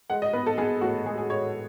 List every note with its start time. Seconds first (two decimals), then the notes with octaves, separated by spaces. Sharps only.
0.10 G#3 F#5
0.22 D#5
0.33 B3 B4
0.46 A4
0.58 B3 G#4
0.81 A2 F#4
1.06 G#3 G#4
1.18 G#4
1.30 G#3 C#5